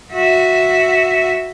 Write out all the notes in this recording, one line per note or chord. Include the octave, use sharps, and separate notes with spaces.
F#4 E5